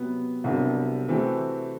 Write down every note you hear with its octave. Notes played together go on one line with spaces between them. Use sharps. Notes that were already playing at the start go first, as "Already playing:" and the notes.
Already playing: C3 F#3 B3
C2 C3 F#3 B3 D4
C3 E3 A3 C4 F#4